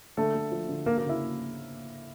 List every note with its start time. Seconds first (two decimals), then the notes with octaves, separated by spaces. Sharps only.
0.17 D3 A3 A4
0.35 A3
0.52 F3
0.69 D3
0.86 A#3 A#4
0.98 A#3 A#4
1.03 C#3
1.09 E4 E5